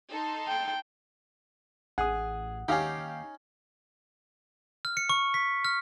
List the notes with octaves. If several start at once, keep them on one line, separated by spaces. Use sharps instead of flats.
D#4 A4 C6
G5
A1 G#4 F#5 D#6
D#2 C#4 D#4 G4 F5
F6
C#7
C#6
B6
F6